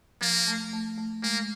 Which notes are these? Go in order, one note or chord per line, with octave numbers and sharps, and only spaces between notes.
F3 A#3
A3
A3
A3
G#3 A#3